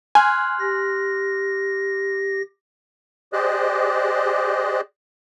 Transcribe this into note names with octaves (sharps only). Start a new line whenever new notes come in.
G#5 C6 F6 F#6
G4 A#6
G4 G#4 C5 D5 D#5 F#6